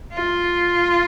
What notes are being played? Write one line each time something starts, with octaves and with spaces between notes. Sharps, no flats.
F4